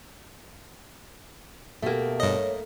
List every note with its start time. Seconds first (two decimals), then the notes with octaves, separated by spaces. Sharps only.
1.82 B2 A3 A#3 G4
2.20 G2 C#5 D#5